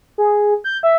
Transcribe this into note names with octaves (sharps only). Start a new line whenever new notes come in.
G#4
G6
E5